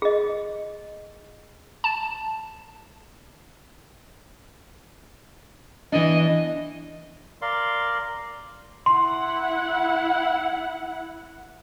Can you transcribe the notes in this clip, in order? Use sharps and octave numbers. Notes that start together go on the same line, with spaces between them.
G#4 D#5
A5
E3 B3 D4 D#5
A#4 D5 F5 C6
E4 F#5 C6